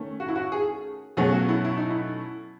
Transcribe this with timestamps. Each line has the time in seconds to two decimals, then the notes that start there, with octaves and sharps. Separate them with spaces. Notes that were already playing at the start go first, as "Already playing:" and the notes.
Already playing: D#3 A3 C#4
0.20 F#4
0.29 E4
0.36 F#4
0.52 G#4
1.17 B2 F#3 A3 C#4 G#4
1.32 F#4
1.49 E4
1.65 E4
1.77 D#4
1.91 E4